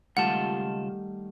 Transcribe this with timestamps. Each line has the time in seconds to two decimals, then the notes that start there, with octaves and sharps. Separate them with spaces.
0.17 C#2 D#3 G3 A3 F4 F#5 A5